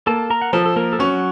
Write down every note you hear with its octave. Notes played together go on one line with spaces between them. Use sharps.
A#3 A4 A5
A#4 A#5
F#5
F3 A4 A5
A4
A#3 A#4
A4
F#3 C#4 F#4